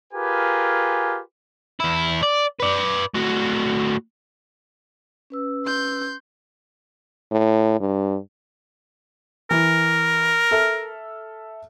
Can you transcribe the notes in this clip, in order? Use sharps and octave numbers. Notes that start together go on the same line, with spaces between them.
F4 G4 G#4 A#4 B4 G#5
E2 E4
D5
B4 D5
A2 F#4
C#4 B4 E6
C6 G6
A2
G2
E3 A#4
A4 E5 F6